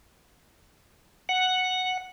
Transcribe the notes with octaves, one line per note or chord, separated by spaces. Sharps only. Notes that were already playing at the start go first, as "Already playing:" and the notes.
F#5